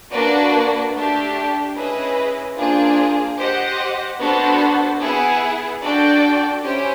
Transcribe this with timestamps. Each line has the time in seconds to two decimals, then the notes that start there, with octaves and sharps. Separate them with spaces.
0.12 A#3 D4 F#4 B4 D5
0.94 A3 D4 G4
1.75 C#4 E4 G#4 B4 D#5
2.57 A#3 D4 F4 G#4 C5
3.38 G4 C5 D#5 F#5
4.20 B3 D4 F#4 A4 C5
5.01 B3 E4 G#4
5.82 D4 F#4 A4 D5 G5
6.63 C#4 E4 G4 C5